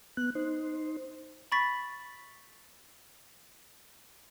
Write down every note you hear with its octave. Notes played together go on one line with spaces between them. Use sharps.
B3 F#6
D#4 C5
B5 C#6 A6 B6